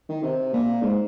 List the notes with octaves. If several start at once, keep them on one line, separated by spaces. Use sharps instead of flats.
D#3
C3
A#2
G#2